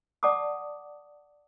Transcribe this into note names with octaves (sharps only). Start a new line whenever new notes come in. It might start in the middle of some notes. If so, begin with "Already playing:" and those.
D5 F#5 A5 D6 D#6